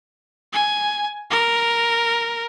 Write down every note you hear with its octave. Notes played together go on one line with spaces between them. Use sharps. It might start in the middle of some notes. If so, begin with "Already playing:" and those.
G#5
A#4